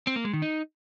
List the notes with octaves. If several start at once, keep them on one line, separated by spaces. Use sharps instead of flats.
C4
A#3
G#3
D#3
D#4